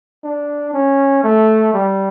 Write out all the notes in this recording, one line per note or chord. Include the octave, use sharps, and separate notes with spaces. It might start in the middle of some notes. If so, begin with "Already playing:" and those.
D4
C#4
A3
G3